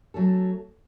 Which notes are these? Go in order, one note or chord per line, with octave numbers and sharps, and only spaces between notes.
F#3 A3 C#4 A4